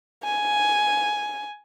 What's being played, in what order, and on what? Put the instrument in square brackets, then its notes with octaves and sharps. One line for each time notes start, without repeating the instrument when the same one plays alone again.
[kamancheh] G#5